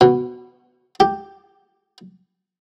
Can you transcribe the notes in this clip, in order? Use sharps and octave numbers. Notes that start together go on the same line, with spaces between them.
B2
G4